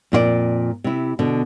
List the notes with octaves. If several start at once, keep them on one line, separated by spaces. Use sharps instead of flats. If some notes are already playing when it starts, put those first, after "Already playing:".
F2 A#2 F4 D5
C3 E4
B2 D3